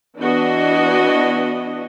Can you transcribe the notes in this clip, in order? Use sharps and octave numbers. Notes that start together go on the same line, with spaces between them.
E3 B3 D4 F#4 D#5